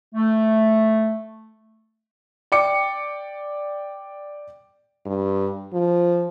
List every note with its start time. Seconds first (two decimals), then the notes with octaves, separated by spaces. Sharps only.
0.14 A3
2.52 D5 G5 D6 C#7
5.06 G2
5.73 F3